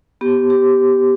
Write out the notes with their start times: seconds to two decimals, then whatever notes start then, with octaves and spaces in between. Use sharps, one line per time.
0.21 B3 G4
0.50 G4